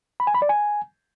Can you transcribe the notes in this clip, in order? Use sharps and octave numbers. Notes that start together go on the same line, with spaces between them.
B5
G#5
B5
D5
G#5